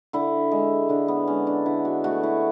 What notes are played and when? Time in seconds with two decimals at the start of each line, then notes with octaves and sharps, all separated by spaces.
0.13 D3 E4
0.51 G#3
0.89 D3 D4
1.08 B3
1.27 G#3 C#4
1.47 D4
1.66 D3 E4
1.85 F#4
2.04 A3 F#4
2.23 E4